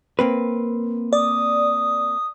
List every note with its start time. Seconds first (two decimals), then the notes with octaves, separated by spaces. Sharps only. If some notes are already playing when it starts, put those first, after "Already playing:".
0.19 A#3 C4 B4
1.13 D5 D#6